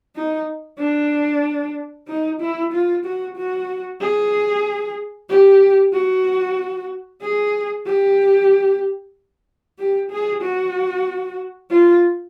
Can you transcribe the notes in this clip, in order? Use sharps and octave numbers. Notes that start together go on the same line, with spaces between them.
D#4
D4
D#4
E4
F4
F#4
F#4
G#4
G4
F#4
G#4
G4
G4
G#4
F#4
F4